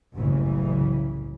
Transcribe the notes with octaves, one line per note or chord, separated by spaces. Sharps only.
F#1 C2 F#2 A2 C#3 E3